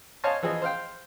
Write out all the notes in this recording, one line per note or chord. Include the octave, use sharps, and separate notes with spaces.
C5 C#5 D#5 F5 G#5 A5
E3 F3 G#4 D#5
C5 F5 G5